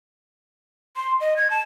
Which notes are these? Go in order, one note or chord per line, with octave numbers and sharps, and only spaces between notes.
C6
D#5
G#6
A5